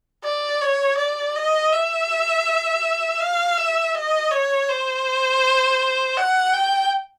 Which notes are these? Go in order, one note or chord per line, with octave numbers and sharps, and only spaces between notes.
D5
C#5
D5
D#5
E5
F5
E5
D#5
C#5
C5
F#5
G5